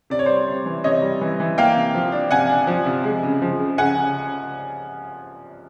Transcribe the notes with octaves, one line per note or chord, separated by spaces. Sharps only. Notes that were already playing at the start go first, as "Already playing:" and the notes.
C3 D5
C#5
G3 C5 D5
C3
E3
C3 C#5 D#5
G3
E3
E3
A#3 F5 G5
C3
F3
D4
C3 F#5 G#5
D4
F3
C3
G#3
C#3
F3
C#3
C#3 F#5 G#5
C#3